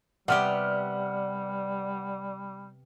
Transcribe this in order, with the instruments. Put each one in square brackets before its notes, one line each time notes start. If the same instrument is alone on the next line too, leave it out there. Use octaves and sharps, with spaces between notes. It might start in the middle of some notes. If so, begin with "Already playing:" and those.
[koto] C3 B3 G4 [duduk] G3 [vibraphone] D5 [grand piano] F#5 F6